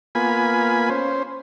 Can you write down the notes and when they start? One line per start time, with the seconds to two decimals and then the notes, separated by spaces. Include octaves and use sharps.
0.15 A#3 B3 F4 G#5 B5
0.90 C#4 C5